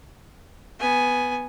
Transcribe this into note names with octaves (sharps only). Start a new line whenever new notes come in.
B3 G#5